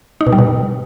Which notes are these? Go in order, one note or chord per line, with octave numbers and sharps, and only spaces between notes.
D#4
B2
G3
B2